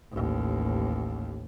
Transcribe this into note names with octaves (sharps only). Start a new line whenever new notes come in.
A1 D#2